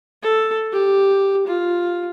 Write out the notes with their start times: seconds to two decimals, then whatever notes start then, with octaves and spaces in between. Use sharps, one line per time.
0.23 A4
0.73 G4
1.47 F4